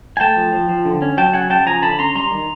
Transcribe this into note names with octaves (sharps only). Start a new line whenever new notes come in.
G#5
A3 G5 A5
F3
F3
F3
D3
C#4
F#3 G5 A5
C#3 F#5 G#5
C#3 G5 A5
F3 G#5 A#5
D3 A5 B5
C#4 A#5 C6
G3 A#5 C6
D#3